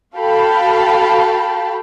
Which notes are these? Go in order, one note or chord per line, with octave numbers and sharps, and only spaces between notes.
F#4 A4 F5 G5 A5 B5